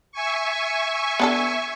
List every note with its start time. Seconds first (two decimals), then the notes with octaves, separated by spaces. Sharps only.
0.12 E5 G#5 C#6
1.20 B3 D4 A4